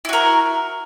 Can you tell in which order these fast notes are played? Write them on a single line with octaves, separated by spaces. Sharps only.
E4 F#4 A#4